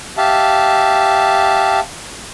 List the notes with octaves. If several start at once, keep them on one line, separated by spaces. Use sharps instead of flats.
G4 E5 F5 A5